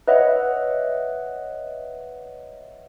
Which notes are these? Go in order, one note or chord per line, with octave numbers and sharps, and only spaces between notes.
B4 C#5 D#5 E5 F#5